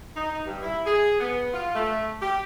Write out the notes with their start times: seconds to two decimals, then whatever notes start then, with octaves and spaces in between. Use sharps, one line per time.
0.16 D#4
0.47 G2
0.63 E4
0.86 G#4
1.20 B3
1.54 F4
1.75 A3
2.21 G4